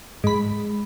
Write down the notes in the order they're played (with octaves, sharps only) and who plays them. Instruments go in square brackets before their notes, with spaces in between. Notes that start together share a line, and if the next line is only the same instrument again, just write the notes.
[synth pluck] G#2 B5 [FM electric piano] G#3